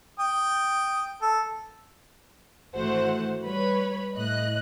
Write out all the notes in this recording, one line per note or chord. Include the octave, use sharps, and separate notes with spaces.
G5 D#6
A4
G#1 E3 A3 F#4 C5 F#5
G3 B4 C#5 B5
A2 D#5 F#6